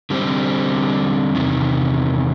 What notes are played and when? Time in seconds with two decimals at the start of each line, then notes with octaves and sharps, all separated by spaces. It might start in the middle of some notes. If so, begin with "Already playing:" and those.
0.10 D3 G3 C4
1.35 E2 C3 D#3